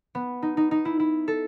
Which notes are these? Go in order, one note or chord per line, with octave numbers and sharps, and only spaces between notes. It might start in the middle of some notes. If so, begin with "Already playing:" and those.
B3
D#4
D#4
D#4
E4
E4
A4